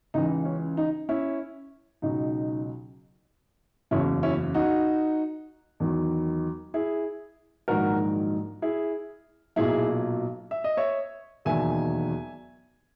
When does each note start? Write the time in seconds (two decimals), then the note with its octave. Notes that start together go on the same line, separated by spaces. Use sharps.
0.14 C#2 C#3 E3 D#4
0.45 C#4
0.77 D#4
1.09 C#4 E4
2.02 C#2 B2 F#3 D#4
3.91 F#1 E2 C#3 F#3 C#4 E4
4.23 C#4 E4
4.54 D#4 F#4
5.80 E2 D#3 F#3
6.74 E4 G#4
7.68 A#1 G#2 D#3 F#3 F#4 A#4
8.62 E4 G#4
9.56 B1 A#2 F#3 E4 G#4
10.51 E5
10.64 D#5
10.77 C#5 E5
11.45 E1 D#2 D#3 F#3 E5 G#5